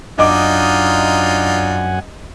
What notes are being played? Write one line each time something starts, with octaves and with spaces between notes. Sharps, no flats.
F#2 D4 D#4 F4 D#5 F#5 G#5 D6